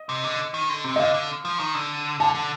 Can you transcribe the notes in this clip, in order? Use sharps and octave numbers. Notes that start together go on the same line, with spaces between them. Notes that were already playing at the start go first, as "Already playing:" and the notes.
Already playing: D#5
C3
D3
D#3
D3
C3
D#5
D3 F5
D3
F3
D#3
D3
D3 A5
D3